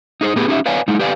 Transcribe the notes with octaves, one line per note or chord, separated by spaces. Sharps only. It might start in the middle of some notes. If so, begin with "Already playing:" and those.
D#4 G#4 C5
A2 B3 G4 G#4 B4
C#4 D#4 G4 A#4 E5
B4 C#5 D5 F5 G#5
G#3 D#4 E4
G4 B4 D5 F5 G5 G#5